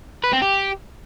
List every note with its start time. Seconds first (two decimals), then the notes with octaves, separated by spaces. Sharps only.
0.24 B4
0.33 C4
0.42 G4